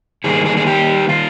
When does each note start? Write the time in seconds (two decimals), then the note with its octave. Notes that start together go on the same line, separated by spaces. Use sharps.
0.24 D#3 G3 A#3 G#4
0.45 G#4
0.57 G#4
0.67 G4
1.09 F4